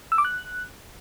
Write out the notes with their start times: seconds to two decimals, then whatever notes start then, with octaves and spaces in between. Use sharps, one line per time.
0.12 E6
0.18 D6
0.25 F#6